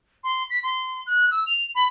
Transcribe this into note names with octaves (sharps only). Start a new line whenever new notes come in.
C6
B6
C6
F#6
E6
F7
B5